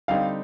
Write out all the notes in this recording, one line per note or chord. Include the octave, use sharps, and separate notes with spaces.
D3 G3 C4 D#4 F5